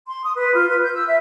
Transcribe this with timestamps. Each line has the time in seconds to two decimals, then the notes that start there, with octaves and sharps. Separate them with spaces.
0.07 C6
0.24 D#6
0.37 B4
0.54 F4
0.69 B4
0.82 G6
0.94 E6
1.06 E5